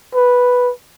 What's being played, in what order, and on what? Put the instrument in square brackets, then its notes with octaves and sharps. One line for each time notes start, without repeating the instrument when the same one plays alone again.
[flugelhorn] B4